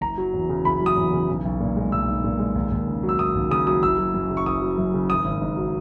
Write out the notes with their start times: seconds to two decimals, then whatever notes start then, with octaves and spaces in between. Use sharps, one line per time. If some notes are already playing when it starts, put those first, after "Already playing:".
0.01 F#1 A#5
0.18 F#3
0.34 E2
0.49 C#3
0.65 F#1 B5
0.81 F#3
0.86 D#6
0.96 E2
1.13 C#3
1.29 B1
1.45 B1
1.60 A#2
1.77 G#3
1.92 B1 E6
2.08 B1
2.24 A#2
2.39 G#3
2.55 D#2
2.71 D#2
2.87 C#3
3.03 F#3
3.09 E6
3.19 D#2 D#6
3.35 D#2
3.50 C#3 D#6
3.67 F#3 D#6
3.83 F#1 E6
3.98 F#3
4.14 F#2
4.30 C#3
4.37 C#6
4.46 F#1 D#6
4.62 F#3
4.78 F#2
4.94 C#3
5.09 G#1 D#6
5.25 G#1
5.41 G#2
5.57 F#3